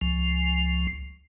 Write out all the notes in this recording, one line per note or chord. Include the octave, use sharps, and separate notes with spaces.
C#2 F3